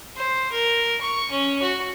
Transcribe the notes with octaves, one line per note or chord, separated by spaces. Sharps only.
C5
A#4
C#6
C#4
F#4